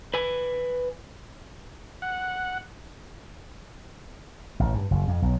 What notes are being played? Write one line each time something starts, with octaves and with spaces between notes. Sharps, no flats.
B4 G#5
F#5
A1
G2
F#1
F2
B1